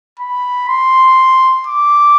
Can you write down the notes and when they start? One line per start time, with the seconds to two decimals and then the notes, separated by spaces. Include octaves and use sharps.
0.19 B5
0.68 C6
1.67 D6